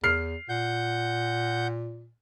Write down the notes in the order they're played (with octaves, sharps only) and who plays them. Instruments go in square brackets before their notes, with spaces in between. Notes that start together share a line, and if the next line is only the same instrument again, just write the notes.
[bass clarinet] E2 [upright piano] F6 C7
[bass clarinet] A#2 [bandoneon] F#5 G6